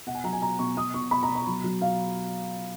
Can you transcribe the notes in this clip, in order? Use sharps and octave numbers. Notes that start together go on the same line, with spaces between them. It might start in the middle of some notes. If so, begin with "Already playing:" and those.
B2 F#5
G#5
F#3 A#5
G#5
B2 A#5
B2 C#6
B2 D#6
B2 C#6
B2 B5
A#5
B2
A#5
F#3
F#3
B2 F5